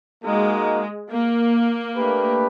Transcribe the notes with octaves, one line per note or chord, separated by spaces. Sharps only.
G#3 A#3 D#4 F#4 A#4 D#5
A#3
A3 D4 G4 B4